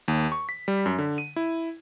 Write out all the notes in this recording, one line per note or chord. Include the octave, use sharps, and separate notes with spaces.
D#2
C#6
B6
G3
F#2
D3
D#7
E4